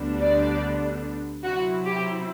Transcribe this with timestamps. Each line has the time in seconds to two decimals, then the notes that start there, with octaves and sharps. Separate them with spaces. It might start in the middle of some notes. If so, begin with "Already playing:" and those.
Already playing: D2 D3 G3 B3 D4
0.19 D5
1.44 C3 F#3 C4 E4 F#4
1.86 G4